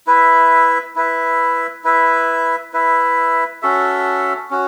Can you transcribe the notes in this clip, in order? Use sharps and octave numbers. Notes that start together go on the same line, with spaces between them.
E4 B4 E5
E4 B4 E5
E4 B4 E5
E4 B4 E5
C#4 F#4 A4 E5
C#4 F#4